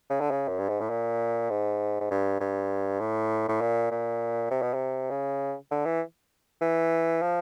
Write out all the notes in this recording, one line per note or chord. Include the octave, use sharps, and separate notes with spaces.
C#3
D3
C#3
F#2
G2
G#2
A2
A#2
G#2
G#2
G2
G2
A2
A2
A#2
A#2
C3
B2
C3
C#3
D3
E3
E3
F3